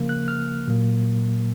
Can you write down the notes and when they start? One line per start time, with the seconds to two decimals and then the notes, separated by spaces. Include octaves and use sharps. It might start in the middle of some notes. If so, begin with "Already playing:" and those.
Already playing: C#3 F3 A#3
0.09 F#6
0.28 F6
0.68 A#2 F#3 A#3